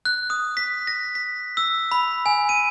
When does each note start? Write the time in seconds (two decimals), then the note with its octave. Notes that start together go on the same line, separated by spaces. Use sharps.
0.05 F#6
0.30 D#6
0.57 B6
0.87 A#6
1.15 B6
1.57 E6
1.91 B5
2.26 G#5
2.49 D#7